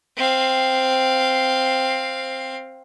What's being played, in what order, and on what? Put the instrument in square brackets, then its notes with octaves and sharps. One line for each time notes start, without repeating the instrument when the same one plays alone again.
[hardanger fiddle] C4 F5